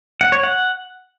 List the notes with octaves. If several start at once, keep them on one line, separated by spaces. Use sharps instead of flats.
F#5
C#5
F#5